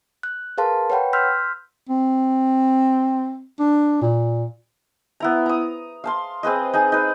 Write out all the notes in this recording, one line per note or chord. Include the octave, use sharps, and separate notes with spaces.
F#6
G#4 A#4 B4 F5 A5 C6
B4 C#5 F#5 G5 B5
C6 E6 F6 G6 B6
C4
D4
A#2
B3 E4 A#5
A#5 D#6
F5 A5 C6
C4 G#4 B4 D#5
D#4 G#4 G#5
D#4 B4